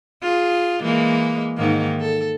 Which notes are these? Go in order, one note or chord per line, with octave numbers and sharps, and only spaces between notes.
F4 G#4
E3 G#3 A#3
G#2 D#3 A#3
A4